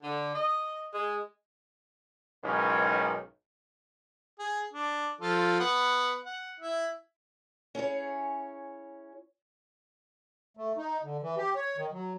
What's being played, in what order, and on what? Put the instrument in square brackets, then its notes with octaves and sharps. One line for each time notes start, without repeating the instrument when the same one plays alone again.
[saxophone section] D3
D#5
G#3
[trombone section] B1 G#2 D#3 E3 C#4
[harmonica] G#4
D4
F3 F4 A4
B3 F#5 B5
F#5
E4 E5
[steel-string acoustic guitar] C#4 E4 G#4 C#5
[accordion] A3
D#4
D3
E3
G4
C#5
D#3
F#3